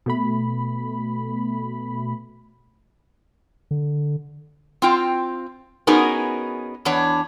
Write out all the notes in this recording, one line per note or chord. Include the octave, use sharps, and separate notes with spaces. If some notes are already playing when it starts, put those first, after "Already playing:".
B2 A3 B5
D3
C4 F4 G5
B3 C#4 D#4 F#4 G#4 A#4
E2 B3 D4 C#5